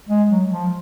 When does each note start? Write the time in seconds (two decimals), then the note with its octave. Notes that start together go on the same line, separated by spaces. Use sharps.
0.09 G#3
0.30 F#3
0.51 F3